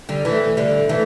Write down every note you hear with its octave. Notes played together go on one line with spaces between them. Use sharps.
D3 G3
E3 A3
D3 G3
E3 A3